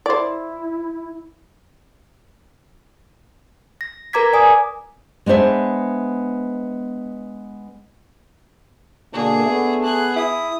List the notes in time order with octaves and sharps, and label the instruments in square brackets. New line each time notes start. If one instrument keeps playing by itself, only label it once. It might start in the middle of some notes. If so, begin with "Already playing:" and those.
[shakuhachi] E4 [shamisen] C5 D5
[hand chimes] A#6
A#4 B4 A#5 D6 G#6 B6
D5 G#5 D#6
[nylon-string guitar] G#3 B3 D4 C5 E5
[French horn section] B2 D3 A#3 [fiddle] D4 G#4
[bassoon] A3 [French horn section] B3
[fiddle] G#4 F#6
[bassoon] E4 [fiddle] D#6